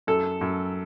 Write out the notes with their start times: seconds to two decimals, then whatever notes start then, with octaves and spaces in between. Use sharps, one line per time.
0.07 F#2 A4
0.41 F#2